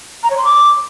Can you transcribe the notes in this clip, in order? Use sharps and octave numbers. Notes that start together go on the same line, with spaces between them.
A#5
C#5
C6
D6